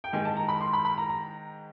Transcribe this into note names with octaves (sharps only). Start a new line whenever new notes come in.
G5
G#2 D#3 G#3 G#5
A5
A#5
B5
C6
B5
B5
A#5
A#5